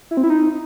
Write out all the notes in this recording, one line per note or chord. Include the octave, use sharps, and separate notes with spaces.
E4
C4
E4
D#4